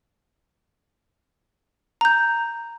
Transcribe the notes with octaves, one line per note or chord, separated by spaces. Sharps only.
A#5 G6